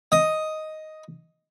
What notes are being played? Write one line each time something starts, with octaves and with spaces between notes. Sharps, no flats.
D#5